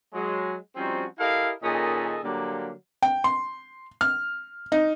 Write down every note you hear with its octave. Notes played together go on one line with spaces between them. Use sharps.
F#3 G#3
F3 G3 C4 C#4 D#4 F#4
E4 G4 A4 A#4 D#5 F5
A#2 D#3 C#4 G#4 A4 D#5
D3 F#3 G3 A#3
G5
C6
F6
D#4